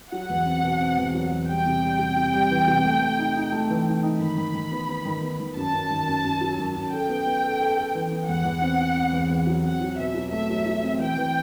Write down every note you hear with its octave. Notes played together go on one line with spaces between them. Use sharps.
F#3 F#5
E2
C4
B2
C4
E2
F#3
E2
G3 G5
C3
G3
C3
C3
G3
E3
C3
A3
A3
D#4
D#4
A3
E3
D#4
D#4
D#3 B5
D#3
D#3
B3
B3
D#3
B3
D#3
F#2 A5
F#2
D#3
F#2
F#2
F#3
F#2
F#2
A4 G5
B3
B3
A4
A4
A4
E3
B3
E2 F#5
E2
C4
C4
C4
E2
E2
F#3
C4 F#5
F#3
B2 E5
F#3
A3 E5
F#3
F#3
C4
E3 G5
E3